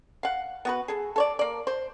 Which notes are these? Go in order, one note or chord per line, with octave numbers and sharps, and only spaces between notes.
F5 F#5
B3 F#4 B4
G#4 A4
A4 C#5 D5
A#3 D5
C5